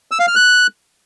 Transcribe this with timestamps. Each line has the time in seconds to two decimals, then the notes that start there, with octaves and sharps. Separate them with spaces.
0.11 E6
0.19 F5
0.28 F6
0.36 F#6